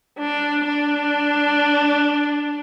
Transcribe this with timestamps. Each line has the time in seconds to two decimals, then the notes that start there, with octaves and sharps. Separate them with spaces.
0.19 D4
0.65 D4